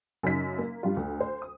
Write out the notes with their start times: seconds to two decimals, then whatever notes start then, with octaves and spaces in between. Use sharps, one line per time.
0.23 F#2 C#3 C#4 D#4 B6
0.59 A#3
0.83 G2 G3 F4
0.97 D2
1.21 C5
1.42 D#6